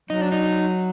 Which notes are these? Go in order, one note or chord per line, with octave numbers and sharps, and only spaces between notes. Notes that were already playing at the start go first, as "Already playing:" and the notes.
F#3 D#4
D4
D#4